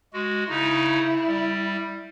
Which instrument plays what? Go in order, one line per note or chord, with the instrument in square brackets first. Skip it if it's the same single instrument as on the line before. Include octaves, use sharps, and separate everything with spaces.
[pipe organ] G#3 F#4
[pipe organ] C#3 D#4 [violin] E4
[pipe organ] G3